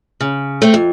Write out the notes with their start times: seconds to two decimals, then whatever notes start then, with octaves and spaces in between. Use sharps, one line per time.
0.20 C#3
0.62 A3 C4
0.74 F2